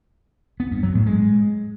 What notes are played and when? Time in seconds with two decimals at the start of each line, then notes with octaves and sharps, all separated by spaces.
0.60 B3
0.71 G2
0.83 F#3
0.95 A2
1.06 G#3